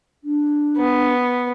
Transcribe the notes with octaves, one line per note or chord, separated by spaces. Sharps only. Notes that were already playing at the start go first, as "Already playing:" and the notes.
D4
B3